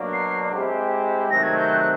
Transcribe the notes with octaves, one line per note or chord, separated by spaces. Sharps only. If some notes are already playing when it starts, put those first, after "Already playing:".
Already playing: B2 F#3 A#3 D4
C7
G#3 C4 E4 G4
C3 D#3 F#3 A3 C4 A#6
G#6
G6
F#6
F#6